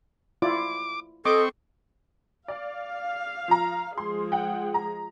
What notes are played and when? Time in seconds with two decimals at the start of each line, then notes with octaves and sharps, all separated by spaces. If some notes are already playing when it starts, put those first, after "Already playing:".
0.42 E4 F4 D5 D6
1.25 C4 A4 D#5 C#6 D6
2.48 D5 F5
3.48 F3 A#5
3.98 F3 G#3 G#4 C6
4.32 F#5 G5
4.74 A#5